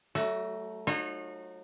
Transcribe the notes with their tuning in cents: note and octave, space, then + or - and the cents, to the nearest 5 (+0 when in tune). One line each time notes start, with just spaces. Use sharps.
F#3 +40 A3 +0 F#4 +5
D#4 -25 F#4 -45 C#5 -35